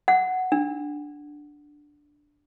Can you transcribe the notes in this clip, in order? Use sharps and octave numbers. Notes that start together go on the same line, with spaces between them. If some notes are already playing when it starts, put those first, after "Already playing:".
F#5
D4